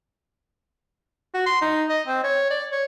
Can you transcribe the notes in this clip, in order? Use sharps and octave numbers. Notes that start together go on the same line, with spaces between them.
F#4
C6
D#4
D#5
C4
C#5
D5
C#5